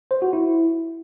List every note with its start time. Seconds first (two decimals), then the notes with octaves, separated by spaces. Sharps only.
0.11 C5
0.22 F#4
0.33 E4